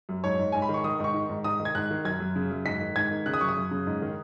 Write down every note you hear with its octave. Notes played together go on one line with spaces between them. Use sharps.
F#2
G#2 C#5
G#2
G#2 G#5
B5
D#3
C#6
D#3 D#6
G#2 C#6
D#3
G#2
G#2 D#6
D#3
G#6
G#2 F#6
D#3
F#2 G#6
F#2
C#3
F#2
G#2 B6
D#3
G#2 G#6
D#3
C#3 F#6
D#6
F#2 C#6
D#6
F#2
C#3
G#2
D#3